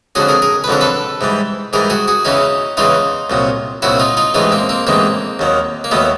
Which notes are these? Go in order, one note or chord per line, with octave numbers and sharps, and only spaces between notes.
F2 D3 F#3 F#4 G#4
G#4 A#4
G#4 A#4
B4
F2 D3 F#3 A#4
A4 B4
G#2 E3 G3
G#2 E3 G3 G#4 A#4
F#4 G#4
F#4 G#4
E2 C#3 E3 C#4 D#4
E2 C#3 E3 D#4 F4
C2 A#2 F#3
C2 A#2 F#3 E4 F#4
D#4 F4
D#4 F4
A1 G#2 E3 G#3 D#4 F4
A#3 C4
A#3 C4
A1 G#2 E3 G#3 A#3 C4
D#2 D#3 F#3
A#3
D#2 D#3 F#3 A3 B3